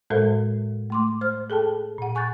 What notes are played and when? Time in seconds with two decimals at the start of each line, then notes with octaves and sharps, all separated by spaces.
0.10 A2 G#3 A4 A#4 C5 E5
0.90 A3 C6 D6
1.21 C5 F6
1.50 G#4 A4 G5 A5
1.98 A#2 F#5
2.15 G#5 C#6 F#6 G6 A6